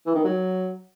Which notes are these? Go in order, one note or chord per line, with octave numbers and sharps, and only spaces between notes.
E3
D#3
F#3